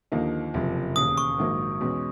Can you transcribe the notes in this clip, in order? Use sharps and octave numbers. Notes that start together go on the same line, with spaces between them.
D#2 D3 F3 A#3 D#4
F#1 F2 C3 F3
E1 D#2 C#3 D#6
C#6
A#1 G#2 D#3 F#3 A#3
E2 B2 G#3 C#4